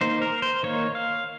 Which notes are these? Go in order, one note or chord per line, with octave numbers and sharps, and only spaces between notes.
D#3 A#3 D#4 C5
A#4
C5
D#3 A#3 D#4 C#5
F5